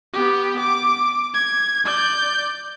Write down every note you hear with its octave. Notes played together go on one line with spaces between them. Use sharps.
B3 G4
D6
G#6
D5 G6